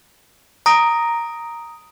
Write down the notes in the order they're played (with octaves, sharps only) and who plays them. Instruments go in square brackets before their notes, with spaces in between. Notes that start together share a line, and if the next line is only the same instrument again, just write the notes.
[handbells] A#5 D#6 A#6 D7